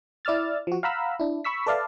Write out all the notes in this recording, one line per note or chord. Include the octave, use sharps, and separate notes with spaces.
E4 D5 E6 F6 A6
F3 F#4
F5 F#5 A#5 B5 E6
D4 E4
B5 C#6 E6 B6
A4 B4 D5 E5 F5 A5